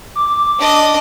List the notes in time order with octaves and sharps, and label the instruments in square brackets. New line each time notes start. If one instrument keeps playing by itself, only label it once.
[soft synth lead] D6
[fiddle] D4 D#5